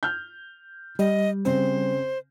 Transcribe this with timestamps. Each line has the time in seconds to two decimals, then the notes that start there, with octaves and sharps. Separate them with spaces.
0.03 F6 G6
0.99 G3 D#5
1.45 C#3 C4 C5